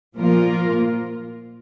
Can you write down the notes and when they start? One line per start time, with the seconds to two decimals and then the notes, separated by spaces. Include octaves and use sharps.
0.18 A#2 F3 A#3 F4 A#4